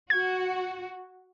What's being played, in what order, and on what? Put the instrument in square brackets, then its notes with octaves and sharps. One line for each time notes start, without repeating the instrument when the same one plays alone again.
[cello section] F#4 [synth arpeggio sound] G#6